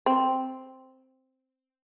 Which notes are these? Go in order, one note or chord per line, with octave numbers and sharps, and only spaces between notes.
C4